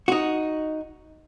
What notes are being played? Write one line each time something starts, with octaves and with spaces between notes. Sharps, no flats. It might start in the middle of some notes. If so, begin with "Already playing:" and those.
D#4 F#4